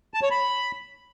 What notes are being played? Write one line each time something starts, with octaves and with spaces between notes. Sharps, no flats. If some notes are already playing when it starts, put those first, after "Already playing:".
A5
C#5
B5